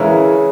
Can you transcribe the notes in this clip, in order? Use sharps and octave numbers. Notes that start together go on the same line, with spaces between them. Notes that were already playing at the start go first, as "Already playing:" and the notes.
Already playing: C#3 E3 G#3 C#4 E4 A#4